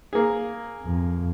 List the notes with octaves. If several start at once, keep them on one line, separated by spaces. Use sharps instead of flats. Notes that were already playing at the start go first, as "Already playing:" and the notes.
A#3 G#4
F2